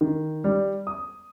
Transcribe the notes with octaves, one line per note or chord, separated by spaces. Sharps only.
D#3
G3
D#6